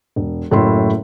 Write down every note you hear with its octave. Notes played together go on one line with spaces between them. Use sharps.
E1
F#1 A2 F#3 A3 E4 C6